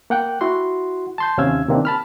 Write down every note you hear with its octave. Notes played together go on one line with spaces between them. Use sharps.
A#3 F#5 G5 F#6
E4 F#4 F#5 C6
A5 C6 G6
D#2 C3 C#4 F5 E6 G#6
C3 D#3 A#3 C4 D4
A5 B5 F6